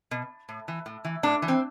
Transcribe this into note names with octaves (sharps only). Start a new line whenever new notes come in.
B2
A2
E3
A2
E3
A2 D4
E3
C4